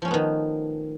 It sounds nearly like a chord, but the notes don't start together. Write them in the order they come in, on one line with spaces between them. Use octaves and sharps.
F3 C#4 A3 B3 D#3